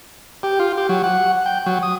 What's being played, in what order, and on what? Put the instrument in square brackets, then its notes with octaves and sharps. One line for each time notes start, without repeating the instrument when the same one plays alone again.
[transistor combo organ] G4
F4
G4
F#3
F#5
G5
F#3
D#6